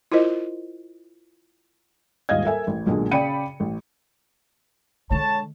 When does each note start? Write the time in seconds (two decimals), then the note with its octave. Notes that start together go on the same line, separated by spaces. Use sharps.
0.12 E4 F4 A#4 C5 D#5
2.29 D#1 G#2 D#5 F5 G#6
2.45 A4 A#4 E5 G#5
2.67 A1
2.86 B1 A#2 D3 G#3
3.11 C#3 D5 G5 B5 C#7 D#7
3.60 A1
5.11 D3 G#3 C#5 A5